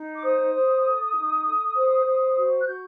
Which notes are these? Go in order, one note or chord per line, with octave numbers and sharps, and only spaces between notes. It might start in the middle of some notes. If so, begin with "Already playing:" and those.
Already playing: D#4
D6
C5 D#6
C5
A4
D#4
A4
C5
C5
F#4
F#6
F#4 G6